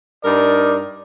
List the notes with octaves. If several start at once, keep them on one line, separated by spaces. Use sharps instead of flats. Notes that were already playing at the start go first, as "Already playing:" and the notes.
G2 D#4 A#4 D5